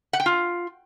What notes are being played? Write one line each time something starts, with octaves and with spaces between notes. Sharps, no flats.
F#5
G5
F4